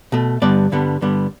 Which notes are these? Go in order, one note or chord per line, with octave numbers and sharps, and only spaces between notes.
B2 A3
G2 D3 G3 B3 D5
G2 D3 G3 B3
G2 D3 G3 B3